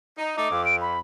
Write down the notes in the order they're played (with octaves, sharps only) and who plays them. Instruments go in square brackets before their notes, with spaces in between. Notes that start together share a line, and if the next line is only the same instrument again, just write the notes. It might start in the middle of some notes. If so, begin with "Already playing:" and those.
[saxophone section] D#4
[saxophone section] A3 D#4 [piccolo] D6
[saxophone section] F2
[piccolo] D7
B5